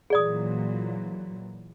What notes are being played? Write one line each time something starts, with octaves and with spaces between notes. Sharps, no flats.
A#2 E3 F#3 G#4 D5 D#6